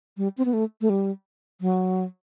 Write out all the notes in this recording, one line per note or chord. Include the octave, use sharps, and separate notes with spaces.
G3
C4
B3
A3
A3
G3
F#3